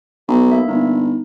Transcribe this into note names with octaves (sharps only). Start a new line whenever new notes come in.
B1
A#3 E5
G1 D#4